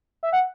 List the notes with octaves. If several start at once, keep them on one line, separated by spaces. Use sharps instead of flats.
E5
F#5